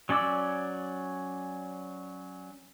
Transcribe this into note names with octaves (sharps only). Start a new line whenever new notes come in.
F#3 C#4 D5 D6 E6